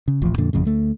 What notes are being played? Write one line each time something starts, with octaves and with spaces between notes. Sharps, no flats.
C#3
D#1 A1 F3
F2 A#2 D3
G1 F2 A2 C#3
D2 A3